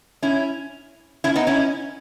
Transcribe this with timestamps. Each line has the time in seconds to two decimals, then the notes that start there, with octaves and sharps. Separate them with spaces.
0.22 C#4 E4
1.24 C#4 E4
1.36 B3 D#4
1.47 C#4 E4